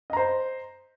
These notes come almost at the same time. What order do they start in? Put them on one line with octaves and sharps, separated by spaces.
D#5 A#5 C5